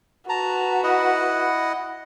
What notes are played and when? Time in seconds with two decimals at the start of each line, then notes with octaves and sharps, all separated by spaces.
0.29 F#4 B4 A5 A#5
0.84 E4 D#5 F#5